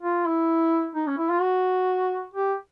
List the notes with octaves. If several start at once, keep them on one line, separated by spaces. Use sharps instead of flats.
F4
E4
D#4
C#4
E4
F4
F#4
G4